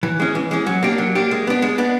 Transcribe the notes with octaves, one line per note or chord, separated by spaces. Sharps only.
E3
G#3 C#4
E3
G#3 C#4
F#3
A#3 D4 G4
F#3
A#3 D4 G4
G#3
B3 D4
G#3
B3 D4